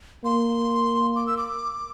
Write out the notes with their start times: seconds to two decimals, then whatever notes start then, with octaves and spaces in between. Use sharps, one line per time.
0.24 A#3 C6
1.16 D6
1.27 E6
1.37 D6